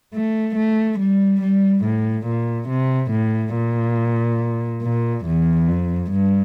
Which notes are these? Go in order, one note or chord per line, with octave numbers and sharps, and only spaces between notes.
A3
A3
G3
G3
A2
A#2
C3
A2
A#2
A#2
E2
F2
G2